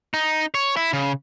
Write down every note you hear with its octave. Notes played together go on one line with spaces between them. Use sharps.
D#4
C#5
E4
C#3